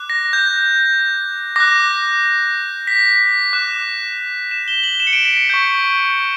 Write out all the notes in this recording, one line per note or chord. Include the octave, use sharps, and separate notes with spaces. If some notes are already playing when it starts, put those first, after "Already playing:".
Already playing: D6 F#6
A#6
G6
D6 F#6 A#6
B6
D6 F#6 E7
E7
G7
F#7
E7
C#7
D7
B6
C#7
C#6 G6